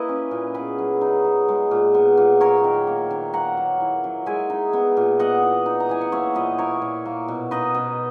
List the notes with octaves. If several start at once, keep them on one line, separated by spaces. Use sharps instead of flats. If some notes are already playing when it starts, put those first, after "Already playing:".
Already playing: A#3 E4 B4 D#5
C#4
A#2
B3 G#4 B4
F#3
D#4
F#3
G#3
A#2
B3
A#2
F#3 A#4 C#5
D#3
A#3
D#3
A#3 F#5 A#5
F#3
E4
F#3
G#3 E5 G#5
D#4
B3
A#2
B3 D#5 F#5
E3
D#4
A#5
E3 G#5
F#5
A#3 C#5 E5
A#2 B4 D#5
E4 A#4 C#5
A#2
A#3
B2
D#4 B4 D#5
B2